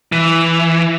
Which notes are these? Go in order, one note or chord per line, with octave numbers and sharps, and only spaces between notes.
E3